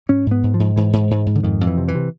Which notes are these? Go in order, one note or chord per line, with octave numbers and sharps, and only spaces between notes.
G#2 C#4
G#2
B3
G#2
F3
G#2
G#2 E3
G#2
G#2
G#2
D3
F2 D#3
F2
E3
C3
E3
C3